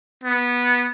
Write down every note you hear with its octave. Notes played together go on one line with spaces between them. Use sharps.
B3